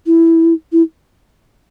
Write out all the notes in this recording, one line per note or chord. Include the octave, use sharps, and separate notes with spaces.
E4
E4